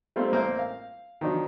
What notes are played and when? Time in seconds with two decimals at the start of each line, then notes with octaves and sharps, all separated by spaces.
0.16 G3 A3 A#3 C4 F4
0.32 A1 A#3 C4 C5
0.59 F5
1.21 D#3 F3 F#3 D4